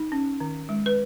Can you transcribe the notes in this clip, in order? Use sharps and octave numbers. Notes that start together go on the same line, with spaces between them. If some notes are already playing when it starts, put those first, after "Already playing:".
Already playing: D#4
C#4
D#3
G#3
B4